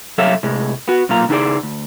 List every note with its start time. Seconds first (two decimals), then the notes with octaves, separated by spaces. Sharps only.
0.18 C2 F#3 A4 C#5 E5 F5
0.43 A2 C3 G#3
0.88 B3 F#4
1.09 B1 A#2 F5 A#5
1.29 C#3 D#4 E4 G#4 D5
1.63 D2